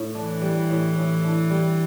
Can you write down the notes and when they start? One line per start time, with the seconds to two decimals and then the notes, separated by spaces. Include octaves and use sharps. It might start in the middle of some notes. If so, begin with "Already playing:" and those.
Already playing: A2
0.15 E3 D4
0.42 G3
0.70 A2
0.97 A2
1.24 D4
1.50 G3